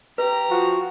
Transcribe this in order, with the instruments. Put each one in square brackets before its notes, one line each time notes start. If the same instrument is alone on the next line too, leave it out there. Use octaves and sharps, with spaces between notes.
[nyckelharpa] G4 A#5 [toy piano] B4
[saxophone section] F3 [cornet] F#4